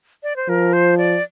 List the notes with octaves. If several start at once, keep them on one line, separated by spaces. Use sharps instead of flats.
D5
C5
F3 A#4
C5
D5